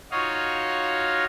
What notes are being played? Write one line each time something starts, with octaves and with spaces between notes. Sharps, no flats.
D#4 F4 F#4 C#5 D#5 F5